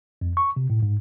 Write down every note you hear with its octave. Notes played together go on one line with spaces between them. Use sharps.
F2
C#6
C3
A2
G#2